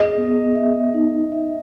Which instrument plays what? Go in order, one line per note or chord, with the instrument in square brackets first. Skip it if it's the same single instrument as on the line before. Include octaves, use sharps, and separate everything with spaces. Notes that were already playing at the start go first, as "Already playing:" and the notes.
Already playing: [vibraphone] G#4 [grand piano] D#5
[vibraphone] B3
E5
D#4
E5